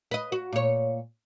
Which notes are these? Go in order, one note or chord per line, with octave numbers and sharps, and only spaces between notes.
B4 D#5
F#4
A#2 C#5